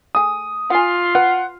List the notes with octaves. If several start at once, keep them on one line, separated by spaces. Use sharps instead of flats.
A3 G#4 D#6
F4 F#5 G#5
B4 F#5